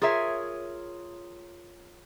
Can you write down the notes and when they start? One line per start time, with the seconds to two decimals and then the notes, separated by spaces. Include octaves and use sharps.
0.02 F4 G#4 A#4 C#5 E5